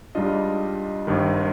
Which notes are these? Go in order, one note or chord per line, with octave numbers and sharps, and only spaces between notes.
G#2 G3 D4 F4 D#5
G#1 G2 D#3